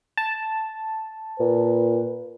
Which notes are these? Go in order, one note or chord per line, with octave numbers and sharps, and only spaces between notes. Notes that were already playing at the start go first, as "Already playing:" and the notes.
A5
A#2 B4